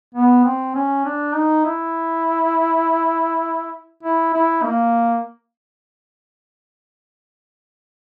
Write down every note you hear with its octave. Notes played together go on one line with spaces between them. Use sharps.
B3
C4
C#4
D4
D#4
E4
E4
E4
A#3